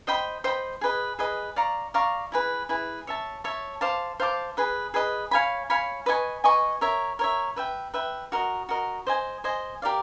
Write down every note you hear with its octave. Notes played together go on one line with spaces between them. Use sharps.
C5 D#5 G5 B5
C5 D#5 G5 B5
G#4 B4 D#5
G#4 B4 D#5
D5 F5 A#5 C#6
D5 F5 A#5 C#6
E4 G#4 B4
E4 G#4 B4
C#5 E5 A5
C#5 E5 A5
C5 F5 A5 D6
C5 F5 A5 D6
G#4 B4 D#5
G#4 B4 D#5
C#5 F5 G#5 B5
C#5 F5 G#5 B5
B4 D#5 G#5 C#6
B4 D#5 G#5 C#6
A#4 C#5 E5
A#4 C#5 E5
B4 E5 G5
B4 E5 G5
F#4 A#4 D#5
F#4 A#4 D#5
C5 D#5 G#5
C5 D#5 G#5
G4 A#4 D5 F5